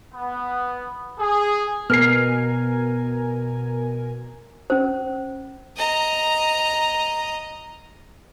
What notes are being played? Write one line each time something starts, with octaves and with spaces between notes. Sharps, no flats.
B3
G#4
B2 B3 A#4 G#5 F6 C7
C#4 C5
D#5 A#5